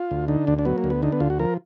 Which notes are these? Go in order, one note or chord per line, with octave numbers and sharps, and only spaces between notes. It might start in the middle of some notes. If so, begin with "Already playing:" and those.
Already playing: F4
D2
D3 D#4
D2 D4
D4
F#3 B3
A#3
D2
B3
D3 D#4
B3
D2 F4
F#4
F3 A#4